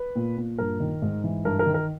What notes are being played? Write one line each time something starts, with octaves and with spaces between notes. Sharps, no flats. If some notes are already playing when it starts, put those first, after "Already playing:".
Already playing: B4
A#2
A#2
G2 A#4
D#3
G#2
E3
G2 A#4
A#4
D#3
A#4